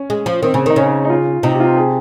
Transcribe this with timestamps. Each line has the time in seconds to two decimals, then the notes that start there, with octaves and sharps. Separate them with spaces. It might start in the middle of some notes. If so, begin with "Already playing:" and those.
Already playing: C#4
0.10 G#3
0.26 F3
0.43 D#3 C4
0.54 C#3
0.66 D#3 D#4
0.76 C#3 C#4
1.05 D#4
1.10 F4
1.43 C3 D#4
1.54 G4
1.60 F4
1.76 G#4